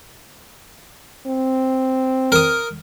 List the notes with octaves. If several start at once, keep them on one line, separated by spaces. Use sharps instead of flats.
C4
A#4 D#6